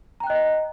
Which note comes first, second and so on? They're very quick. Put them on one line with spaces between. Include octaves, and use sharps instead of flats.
A#5 G5 F#6 D#5